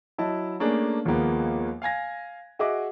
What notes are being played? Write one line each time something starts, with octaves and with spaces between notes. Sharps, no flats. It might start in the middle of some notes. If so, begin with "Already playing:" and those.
F#3 E4 D#5 A5
A3 A#3 C#4 D4 G#4
D#2 F3 G#3 A#3 B3
F5 G#5 G#6 A#6
F#4 G#4 D#5 E5 F#5 D6